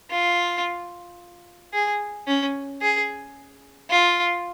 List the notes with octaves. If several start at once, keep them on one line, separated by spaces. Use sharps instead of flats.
F4
G#4
C#4
G#4
F4